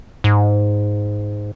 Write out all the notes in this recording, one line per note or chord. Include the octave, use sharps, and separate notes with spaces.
G#2